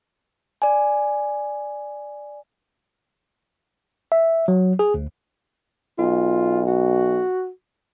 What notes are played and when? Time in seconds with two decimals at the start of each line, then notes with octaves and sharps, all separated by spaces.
0.62 D5 G#5
4.12 E5
4.48 F#3
4.79 G#4
4.94 D2
5.99 B1 F4
6.67 F#4